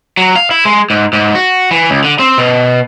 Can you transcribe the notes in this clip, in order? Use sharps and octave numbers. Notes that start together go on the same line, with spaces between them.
F#3
F5
E4
G#3
G#2
G#2
F#4
E3
C#2
D3
C4
B2